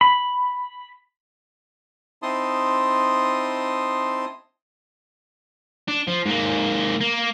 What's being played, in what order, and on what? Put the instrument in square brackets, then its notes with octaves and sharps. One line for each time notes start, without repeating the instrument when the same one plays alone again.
[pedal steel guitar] B5
[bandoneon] C4 D#4 E4 A5 C6 D#6
[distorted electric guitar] D4
F3
G#2 A#3
A#3